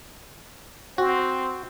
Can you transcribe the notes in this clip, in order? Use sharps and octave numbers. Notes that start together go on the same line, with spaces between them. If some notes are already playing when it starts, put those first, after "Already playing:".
C4 F#4